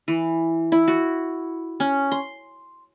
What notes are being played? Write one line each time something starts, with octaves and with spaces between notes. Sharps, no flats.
E3
E4
F#4
C#4
C6